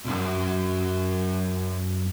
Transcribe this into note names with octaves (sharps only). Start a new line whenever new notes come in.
B1 F#2